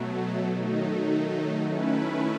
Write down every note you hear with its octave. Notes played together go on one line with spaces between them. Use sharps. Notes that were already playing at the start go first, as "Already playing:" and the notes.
Already playing: B2 F#3 A3
D#3 F#3 A3 D#4
D#3 A3 C#4 E4 B4